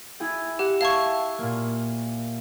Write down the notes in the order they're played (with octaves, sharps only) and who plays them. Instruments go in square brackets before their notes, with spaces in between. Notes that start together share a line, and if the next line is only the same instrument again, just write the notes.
[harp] E4 G#4 G5
[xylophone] G4 [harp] F#5
[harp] E5 A5 G#6 [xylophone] F5 C#6
[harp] A#2 A#3